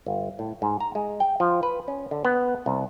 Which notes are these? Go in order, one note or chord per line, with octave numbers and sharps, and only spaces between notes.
G1
A2
G#2
A#5
G#3
G5
F3
B4
C#4
D3
B3
C2